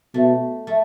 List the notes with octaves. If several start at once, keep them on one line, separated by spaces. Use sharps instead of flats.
B2 A3
A3